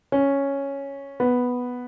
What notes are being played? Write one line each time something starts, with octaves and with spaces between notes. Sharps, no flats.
C#4
B3